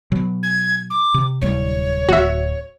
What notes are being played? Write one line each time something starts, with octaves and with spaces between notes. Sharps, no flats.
B2 F#3
G#6
D6
C3
D1 C2 G3 C#5
D1 F#4 E5